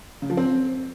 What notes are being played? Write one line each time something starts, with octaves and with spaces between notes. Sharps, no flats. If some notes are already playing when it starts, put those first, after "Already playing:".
C#3
F3
C4